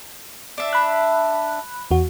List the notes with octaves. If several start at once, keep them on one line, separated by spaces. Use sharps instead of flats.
D4 E5
B5 F#6
E2 F#4